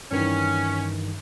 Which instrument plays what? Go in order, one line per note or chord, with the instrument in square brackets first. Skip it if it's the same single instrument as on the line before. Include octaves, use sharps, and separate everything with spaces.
[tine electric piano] G2 D#3 E3 [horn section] C#4